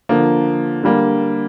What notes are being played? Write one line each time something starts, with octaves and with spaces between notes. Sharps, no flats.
D3 F3 A#3
D3 G3 A#3